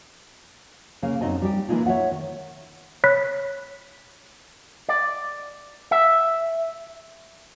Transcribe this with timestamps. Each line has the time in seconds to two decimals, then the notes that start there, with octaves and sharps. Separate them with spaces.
1.02 C#3 A#3
1.21 F#2 C4 D#4 D5 D#5 G#5
1.42 G3 G4
1.68 E3 G#3 A#3 D#4 F4 G#4
1.86 C#5 E5 F#5
2.12 D#3
3.04 C#5 B5 F#6 B6
4.89 D5
5.91 E5